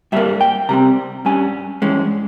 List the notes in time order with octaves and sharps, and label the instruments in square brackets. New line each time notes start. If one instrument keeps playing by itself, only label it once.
[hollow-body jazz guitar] G2 G3 A#3 E5
G5
C3 G3 C4 A#5
G2 G3 C#4 G#5
G2 E3 G#3 C#4